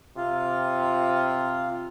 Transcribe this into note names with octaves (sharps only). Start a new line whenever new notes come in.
C3 F4